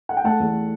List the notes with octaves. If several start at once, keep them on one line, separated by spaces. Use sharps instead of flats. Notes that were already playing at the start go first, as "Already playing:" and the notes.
F#5
G5
A3 F#5 A5
E2